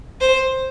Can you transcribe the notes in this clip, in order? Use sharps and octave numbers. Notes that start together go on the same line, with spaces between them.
C5